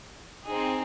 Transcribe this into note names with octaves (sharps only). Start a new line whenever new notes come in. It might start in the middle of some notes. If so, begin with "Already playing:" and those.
C4 D#4 G#4